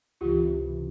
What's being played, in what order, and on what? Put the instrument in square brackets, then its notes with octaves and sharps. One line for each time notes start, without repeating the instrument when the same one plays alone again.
[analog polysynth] C#2 C3 E3 [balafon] F4 G4